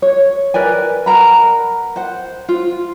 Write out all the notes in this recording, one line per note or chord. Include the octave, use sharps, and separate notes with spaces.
C#5
A#4 B4 D5 G#5
A#4 F#5 A#5 B5
C5 F#5
F4